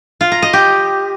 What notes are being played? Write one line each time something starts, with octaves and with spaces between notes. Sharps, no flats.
F4
A#5
D#5
G4